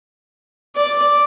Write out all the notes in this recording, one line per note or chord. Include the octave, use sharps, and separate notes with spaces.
D5